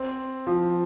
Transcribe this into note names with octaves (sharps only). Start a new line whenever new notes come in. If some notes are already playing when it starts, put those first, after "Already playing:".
Already playing: C4
F3